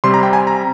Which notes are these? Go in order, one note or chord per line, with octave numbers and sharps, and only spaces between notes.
C3 G3 C4 C6
A#5
G5
G#5
A#5